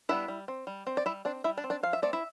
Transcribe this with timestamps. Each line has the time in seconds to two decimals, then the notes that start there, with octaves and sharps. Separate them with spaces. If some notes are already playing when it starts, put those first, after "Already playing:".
0.09 G3 B3 D4 E4 E5
0.28 G3
0.48 C4
0.67 G3
0.87 C4
0.97 D5
1.06 G3 E4 E5
1.25 C4 D4 D5
1.44 G3 E4 E5
1.57 D4 D5
1.64 C4
1.70 D4 D5
1.83 F3 F5
1.93 E5
2.02 A3 C4 D5
2.13 E4 E5